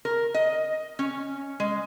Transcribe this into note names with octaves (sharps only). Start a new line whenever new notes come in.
A#4
D#5
C#4
G#3